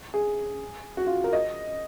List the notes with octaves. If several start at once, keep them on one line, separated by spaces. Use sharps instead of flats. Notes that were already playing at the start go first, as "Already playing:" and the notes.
G#4
F#4
F4
A#4
D#5